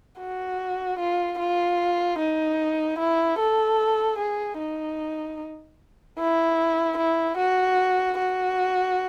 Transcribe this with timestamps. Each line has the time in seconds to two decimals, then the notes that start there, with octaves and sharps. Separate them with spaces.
0.20 F#4
1.00 F4
1.39 F4
2.19 D#4
2.99 E4
3.39 A4
4.19 G#4
4.59 D#4
6.19 E4
6.98 E4
7.38 F#4
8.18 F#4